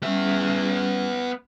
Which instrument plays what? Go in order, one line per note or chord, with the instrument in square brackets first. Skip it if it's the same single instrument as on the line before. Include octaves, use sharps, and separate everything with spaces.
[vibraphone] G3 C#4 [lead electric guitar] B3 E5